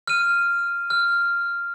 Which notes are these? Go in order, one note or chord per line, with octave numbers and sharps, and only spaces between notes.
F6 D#7
F6